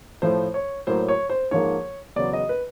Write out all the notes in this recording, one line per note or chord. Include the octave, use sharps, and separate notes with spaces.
A2 F3 A3 C5
C#5
A2 F#3 A#3 C5
C#5
C5
G#2 F3 A#3 C#5
E2 C#3 F#3 B3 D5
D#5
B4